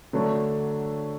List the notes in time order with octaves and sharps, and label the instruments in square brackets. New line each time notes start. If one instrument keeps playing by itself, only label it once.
[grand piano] D3 F#3 A3 D4